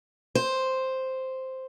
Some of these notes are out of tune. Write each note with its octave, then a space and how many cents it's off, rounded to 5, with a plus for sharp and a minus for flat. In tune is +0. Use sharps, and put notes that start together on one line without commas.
C5 +0